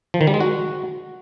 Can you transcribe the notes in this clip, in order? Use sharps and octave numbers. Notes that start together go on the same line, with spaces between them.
F3
D#3
G3
G#3
F#4